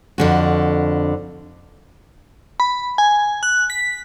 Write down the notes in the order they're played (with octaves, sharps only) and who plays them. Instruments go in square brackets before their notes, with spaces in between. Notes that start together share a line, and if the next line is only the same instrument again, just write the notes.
[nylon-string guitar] F2 D3 F#4
[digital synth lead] B5
G#5
F#6
B6